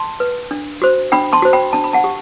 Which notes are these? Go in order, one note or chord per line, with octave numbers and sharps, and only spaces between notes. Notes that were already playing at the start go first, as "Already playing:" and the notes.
Already playing: A5 C6
B4
D4
F#4 C5
D4 G5 B5
A5 C6
F#4 C5
G5 B5
D4 A5
B5
F#5 A5
G4